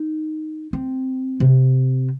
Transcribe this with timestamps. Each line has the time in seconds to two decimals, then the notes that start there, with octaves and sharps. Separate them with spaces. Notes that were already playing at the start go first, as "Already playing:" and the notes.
Already playing: D#4
0.73 C4
1.40 C3